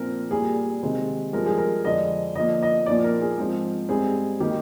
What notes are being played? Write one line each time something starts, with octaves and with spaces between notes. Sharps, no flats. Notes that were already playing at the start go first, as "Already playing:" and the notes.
Already playing: A#2 F3 C4 A#4
A#2 G3 A#3 G#4
C3 D#3 G#3 C4
G2 F3 G#3 A#4
G#4
A#4
F2 D3 G#3 D#5
D3 F3 A#3 D#5
D#5
A#2 F3 A#3 D5
A#4
G#4
G#2 F3 C4
G#2 G3 C4 G#4
D#3 G3 A#3 G4